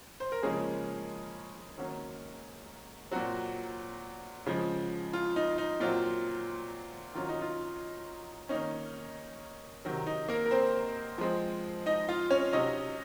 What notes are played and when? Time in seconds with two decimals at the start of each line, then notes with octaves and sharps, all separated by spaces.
0.20 C5
0.32 A#4
0.43 C#3 F3 G#3 A#3 C#4 G#4
1.78 D#3 F#3 A#3 C#4
3.11 A#2 F#3 C4 F#4
4.46 C#3 F3 G#3
5.13 F4
5.36 D#4
5.58 D#4
5.80 A#2 F#3 C4 F4
7.15 D#3 F#3 C#4 F4
7.29 D#4
7.41 F4
8.49 D#3 A#3 C#4 D#4
9.85 C3 D#3 F#3
10.07 D#4
10.28 A#3 A#4
10.46 A#4
10.51 C4 C5
11.18 F3 G#3 C4
11.86 D#4 D#5
12.08 F4 F5
12.30 C#4 C#5
12.53 C3 F#3 C#4 D#4 D#5